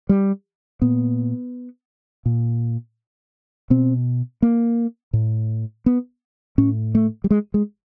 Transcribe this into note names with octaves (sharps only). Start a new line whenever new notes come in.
G3
A#2 B3
A#2
B2 C4
A#3
A2
B3
A2 C#4
A3
G3
G#3
G#3